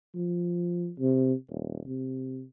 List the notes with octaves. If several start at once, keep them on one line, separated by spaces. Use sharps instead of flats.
F3
C3
D#1
C3